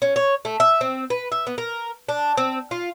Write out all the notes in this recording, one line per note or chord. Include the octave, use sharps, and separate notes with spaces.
C#4
C#5
A3
E5
C4
B4
E5
B3
A#4
D4
C4
F4